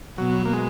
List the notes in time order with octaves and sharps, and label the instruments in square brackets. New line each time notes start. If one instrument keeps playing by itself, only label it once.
[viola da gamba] B2 B3 [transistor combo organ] F#3
[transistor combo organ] A#3
G#3